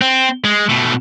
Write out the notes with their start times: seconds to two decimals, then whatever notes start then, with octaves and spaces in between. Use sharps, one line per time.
0.02 C4
0.44 G#3
0.69 B2 A3